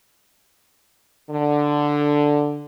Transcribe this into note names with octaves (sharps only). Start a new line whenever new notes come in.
D3